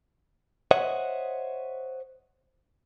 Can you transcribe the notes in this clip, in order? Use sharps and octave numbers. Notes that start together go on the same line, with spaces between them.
C5 C#5 D#5 E5 F#5